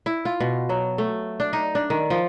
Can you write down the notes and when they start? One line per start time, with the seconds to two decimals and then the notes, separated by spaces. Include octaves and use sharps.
0.06 E4
0.25 F4
0.40 B2
0.69 F#3
0.98 A3
1.40 D4
1.53 D#4
1.75 D4
1.90 D#3
2.10 F3